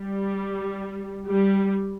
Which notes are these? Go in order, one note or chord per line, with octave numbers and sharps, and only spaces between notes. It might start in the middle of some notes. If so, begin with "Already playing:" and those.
Already playing: G3
G3